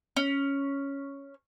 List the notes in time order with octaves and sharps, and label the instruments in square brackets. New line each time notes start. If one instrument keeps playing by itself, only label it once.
[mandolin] C#4